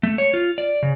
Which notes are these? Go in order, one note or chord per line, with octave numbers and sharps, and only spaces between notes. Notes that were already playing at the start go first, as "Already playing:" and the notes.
A3
C#5
F4
D5
C#3